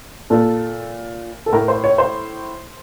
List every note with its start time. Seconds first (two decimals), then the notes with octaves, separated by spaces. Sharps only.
0.30 A#2 A4
1.46 A4
1.53 A2 A#4
1.68 C5
1.84 C#5
1.98 C5